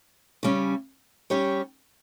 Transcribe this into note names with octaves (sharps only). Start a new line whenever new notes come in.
C#3 G3 C#4
G3 C#4 G4 C#5